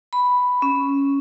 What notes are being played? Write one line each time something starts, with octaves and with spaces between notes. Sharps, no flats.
B5
C#4